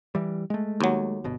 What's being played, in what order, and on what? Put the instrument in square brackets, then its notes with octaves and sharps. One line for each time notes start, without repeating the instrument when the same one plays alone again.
[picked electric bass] E3 G3
G#3 A3
[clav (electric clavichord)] D#2 F#3
[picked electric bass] G1 B2